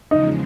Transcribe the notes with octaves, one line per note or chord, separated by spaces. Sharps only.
E2 C#3 F3 G#3 D#4